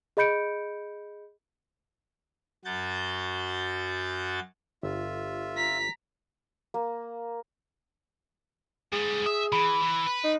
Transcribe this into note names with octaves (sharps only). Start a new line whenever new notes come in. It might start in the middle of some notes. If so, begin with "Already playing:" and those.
G#4 D#5 B5 G6 C#7 D7
F#2 F#3 F#4 G6 A6
G1 F4 E5
A#5 B6
A#3
G#2 G3 G#4
E5 D#6
E3 B5
E3
B4
D#4